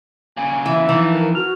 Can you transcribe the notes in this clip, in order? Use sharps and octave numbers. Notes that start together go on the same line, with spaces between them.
A#2 C#3 G#5
G#5
E3 E5
F2 E3 D#4
A#4
F#4 F6